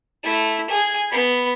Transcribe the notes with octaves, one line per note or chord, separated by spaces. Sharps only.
A3 E4
G#4 G#5
B3 B5